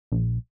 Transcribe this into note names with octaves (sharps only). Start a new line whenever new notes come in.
A#1